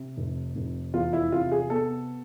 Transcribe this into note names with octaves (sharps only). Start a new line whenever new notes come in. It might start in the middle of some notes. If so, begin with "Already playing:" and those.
Already playing: C3
F1
F1
E2 F4
E4
C3 F4
G#4
B3 A4